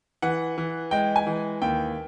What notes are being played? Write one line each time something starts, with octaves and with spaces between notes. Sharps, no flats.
E3 F#5
E3
G#3 G5
G#5
E3
D#2 G5